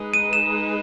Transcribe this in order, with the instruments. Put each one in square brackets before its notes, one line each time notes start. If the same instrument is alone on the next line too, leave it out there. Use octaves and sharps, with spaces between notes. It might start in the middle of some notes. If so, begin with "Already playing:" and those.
Already playing: [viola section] G#3 D#4 G#4 B4
[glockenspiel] D#7
E7